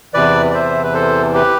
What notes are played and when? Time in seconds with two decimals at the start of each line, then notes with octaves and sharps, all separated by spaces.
0.14 E2 C3 E3 B4 D5
0.51 D5
0.54 C5 E5
0.84 B4
0.94 A4 C5
1.34 G4 B4